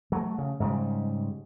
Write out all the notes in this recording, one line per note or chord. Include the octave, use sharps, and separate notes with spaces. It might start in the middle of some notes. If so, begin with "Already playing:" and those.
F#3 A3
C#3
G#2 C#3 G3